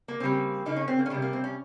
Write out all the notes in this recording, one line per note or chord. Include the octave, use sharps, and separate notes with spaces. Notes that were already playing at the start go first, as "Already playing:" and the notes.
A#3
C#3 G3 A#3 C4
C#3 G3 A#3 D#4
C#4
C4
A#3
C#4
C3 G3 A#3 C4
A#3
C4
C#4